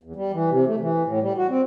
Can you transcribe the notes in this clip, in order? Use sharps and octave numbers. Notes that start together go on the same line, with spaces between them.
E2
G3
E3
C3
A3
E3
A2
G3
F#4
C4